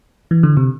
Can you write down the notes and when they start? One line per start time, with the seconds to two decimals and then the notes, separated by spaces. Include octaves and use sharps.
0.31 E3
0.43 D3
0.57 C3